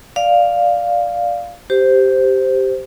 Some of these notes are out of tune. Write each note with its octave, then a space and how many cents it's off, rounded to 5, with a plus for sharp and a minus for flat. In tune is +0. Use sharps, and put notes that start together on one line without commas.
D5 +0 F5 +0
G4 -5 C5 -5